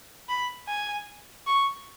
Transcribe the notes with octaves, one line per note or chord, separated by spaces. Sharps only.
B5
G#5
C#6